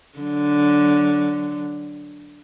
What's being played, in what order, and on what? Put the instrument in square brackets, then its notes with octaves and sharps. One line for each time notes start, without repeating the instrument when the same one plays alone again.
[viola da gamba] D3 F#3